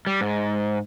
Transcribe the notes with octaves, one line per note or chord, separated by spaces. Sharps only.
G3
G#2